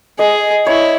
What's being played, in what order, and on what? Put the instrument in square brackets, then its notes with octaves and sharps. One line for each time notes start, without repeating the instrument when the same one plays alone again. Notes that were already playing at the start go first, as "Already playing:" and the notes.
[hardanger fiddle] G#4 [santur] D#5
[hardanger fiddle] E4 [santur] C#5